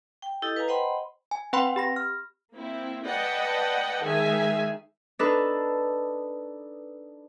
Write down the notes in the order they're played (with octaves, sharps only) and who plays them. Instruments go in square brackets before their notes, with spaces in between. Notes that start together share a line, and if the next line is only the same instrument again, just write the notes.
[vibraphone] G5
E4 G4 A4 D#5 D#6
B4 F5 G#5 A#5
C5 D#5 F#5 G5 B5 C6
[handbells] G#5
C4 B4 F#5 G5 B5 C6
G4 B5 A#6
F6
[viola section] A#3 C4 E4
B4 D5 D#5 F#5 G5 A5
D#3 G#3 G#4 E5 G#5
[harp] D4 D#4 A4 B4